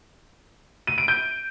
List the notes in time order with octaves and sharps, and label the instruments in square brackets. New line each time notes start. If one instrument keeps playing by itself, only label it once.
[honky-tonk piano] D#7
D7
G6